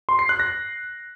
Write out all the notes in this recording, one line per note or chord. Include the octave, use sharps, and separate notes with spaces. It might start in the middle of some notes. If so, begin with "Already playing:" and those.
C6
C7
F#6
A#6